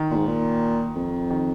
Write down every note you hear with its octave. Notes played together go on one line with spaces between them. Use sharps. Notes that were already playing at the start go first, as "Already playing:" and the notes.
Already playing: D#3
A#2
G#2
A#2
F2
D#3